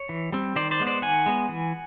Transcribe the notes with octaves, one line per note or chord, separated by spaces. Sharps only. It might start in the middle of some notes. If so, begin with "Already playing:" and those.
Already playing: C#5
E3
G3 C4
D#3 C5 D5
C5 D5
G#3 B3
C5 D5
D#3 F#5 G#5
G#3 B3
E3